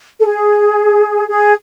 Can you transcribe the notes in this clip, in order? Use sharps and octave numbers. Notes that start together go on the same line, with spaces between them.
A4
G#4
G#4